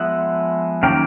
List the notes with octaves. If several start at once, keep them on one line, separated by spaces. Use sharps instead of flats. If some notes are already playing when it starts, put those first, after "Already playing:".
Already playing: F3 G#3 B3 E5 F#5
D#3 F#3 A#3 C#4 F5 G5